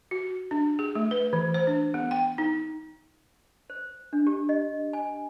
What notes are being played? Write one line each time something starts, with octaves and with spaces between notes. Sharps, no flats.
F#4
D4
G#4
A3
B4
E3
C5
D4
B3
G5
D#4
C5
D4
G4
D#5
G#5